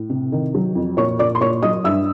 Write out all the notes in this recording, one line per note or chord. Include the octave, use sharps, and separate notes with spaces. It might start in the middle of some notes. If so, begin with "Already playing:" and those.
Already playing: A2
C3
D#3
F#3
F2
A#2 C#5 C#6
A#2 D5 D6
C6
A#2 C#5 C#6
F#3 D#5 D#6
G2 E5 E6